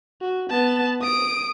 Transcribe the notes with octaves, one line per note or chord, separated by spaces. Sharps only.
F#4
B3 A5
D#6 D7